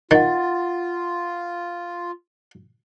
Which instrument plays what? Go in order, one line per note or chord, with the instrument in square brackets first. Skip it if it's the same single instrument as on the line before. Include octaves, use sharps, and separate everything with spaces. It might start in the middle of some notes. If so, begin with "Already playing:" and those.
[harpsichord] D#3 [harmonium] F4 [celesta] F#5 A6